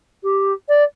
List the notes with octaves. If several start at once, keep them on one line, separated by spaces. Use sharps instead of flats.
G4
D5